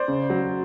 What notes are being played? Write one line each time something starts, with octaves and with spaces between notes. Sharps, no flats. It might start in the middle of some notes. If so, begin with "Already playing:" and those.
Already playing: C5 D5
C#3
F#3